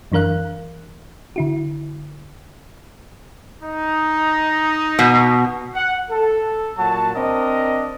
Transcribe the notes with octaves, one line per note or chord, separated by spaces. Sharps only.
F#2 E3 D4 A#4 F5 F#6
D3 E4 F#4
D#4
B2
F#5
A4
A#2 F#3 F#4 A5
C4 D4 A#4 D#5